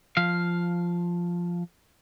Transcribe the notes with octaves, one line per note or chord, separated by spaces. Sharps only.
F3 F5